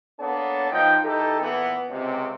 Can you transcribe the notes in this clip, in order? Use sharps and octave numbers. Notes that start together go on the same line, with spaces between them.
A#3 B3 D4 A4 C#5 A5
F3 D#4 G5
E3 D#4 G4 A4
A#2 E3 B3
C#2 C3